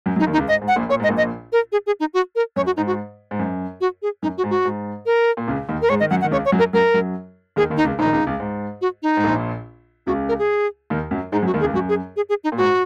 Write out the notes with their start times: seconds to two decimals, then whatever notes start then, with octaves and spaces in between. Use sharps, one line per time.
0.06 F#2 F#3
0.16 F#2 F#3
0.20 D#4
0.27 D#2 D#3
0.33 D#4
0.37 C#2 C#3
0.47 G#2 D#5
0.62 G#2
0.68 F#5
0.76 A#1 A#2
0.89 A#2 C#5
1.00 G#2 D#5
1.09 A#1 A#2
1.17 D#5
1.52 A#4
1.72 G#4
1.87 G#4
2.00 D#4
2.14 F#4
2.36 A#4
2.56 F#2 C#5
2.66 F#4
2.77 G#2 D#4
2.87 F#4
3.31 G#2
3.39 F#2
3.81 F#4
4.02 G#4
4.22 F#2 D#4
4.38 F#4
4.43 G#2
4.50 F#4
4.65 G#2
5.06 A#4
5.37 A#2
5.48 C#2 C#3
5.69 D#2 D#3
5.82 A#4
5.89 G#2 G#3 C#5
6.00 D#3 D#5
6.10 F#2 F#3 F#5
6.21 F#5
6.24 D#3
6.31 C#2 C#3 C#5
6.45 C#5
6.52 F#2 F#3
6.59 A#4
6.73 F#2 F#3 A#4
6.94 F#2 F#3
7.56 D#2 D#3 G#4
7.70 D#2 D#3
7.77 D#4
7.84 C#2 C#3
7.99 A#1 A#2 D#4
8.05 D#3
8.13 C#2 C#3
8.27 C#2 C#3
8.40 G#2
8.81 F#4
9.03 D#4
9.17 G#2
9.24 A#1 A#2
10.07 C#2 C#3 F#4
10.29 A#4
10.39 G#4
10.90 D#2 D#3
11.11 F#2 F#3
11.32 G#2 G#3 D#4
11.42 F#2 F#3
11.47 F#4
11.54 D#2 D#3
11.60 G#4
11.64 C#2 C#3
11.74 F#2 F#4
11.89 G#4
12.16 G#4
12.29 G#4
12.44 D#4
12.52 A#2
12.57 G#2 F#4